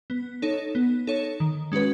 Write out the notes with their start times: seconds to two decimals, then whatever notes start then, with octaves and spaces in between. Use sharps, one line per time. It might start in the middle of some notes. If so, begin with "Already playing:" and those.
0.10 B3
0.42 D#4 A4 C#5
0.75 B3
1.07 D#4 A4 C#5
1.40 D#3
1.72 G#3 C#4 F#4 B4